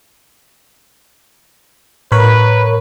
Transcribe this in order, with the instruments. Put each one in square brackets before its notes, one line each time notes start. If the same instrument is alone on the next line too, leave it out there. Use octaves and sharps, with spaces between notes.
[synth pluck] A2 [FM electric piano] A#4 C#5 B5 [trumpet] B4